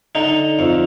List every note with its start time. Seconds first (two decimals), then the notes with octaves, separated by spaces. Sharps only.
0.15 D3 D#4
0.59 F2